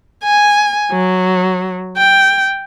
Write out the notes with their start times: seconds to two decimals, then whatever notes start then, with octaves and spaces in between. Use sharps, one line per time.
0.24 G#5
0.92 F#3
1.98 G5